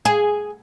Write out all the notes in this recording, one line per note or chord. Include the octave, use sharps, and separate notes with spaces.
G#4